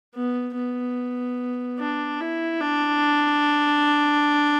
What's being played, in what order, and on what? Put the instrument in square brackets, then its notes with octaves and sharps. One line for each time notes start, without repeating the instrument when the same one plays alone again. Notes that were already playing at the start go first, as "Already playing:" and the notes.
[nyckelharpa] B3
B3
D4
E4
D4